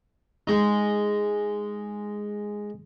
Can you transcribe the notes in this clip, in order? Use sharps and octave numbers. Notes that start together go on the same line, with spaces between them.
G#3 D#4